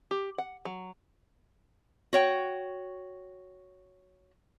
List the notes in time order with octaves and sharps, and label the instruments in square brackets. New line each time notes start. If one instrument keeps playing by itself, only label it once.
[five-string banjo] G4
F#5
F#3
[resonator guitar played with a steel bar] F#4 C#5 G5